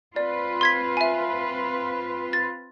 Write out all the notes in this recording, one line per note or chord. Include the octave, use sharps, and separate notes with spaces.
C4 F4 B4 D5
C6 G#6 B6
E5 G#5
A6